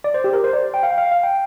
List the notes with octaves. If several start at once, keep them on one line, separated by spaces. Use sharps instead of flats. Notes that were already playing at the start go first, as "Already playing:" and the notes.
D5
C5
G4
A#4
C5
D5
G5
F5
G5
F5
F5
G5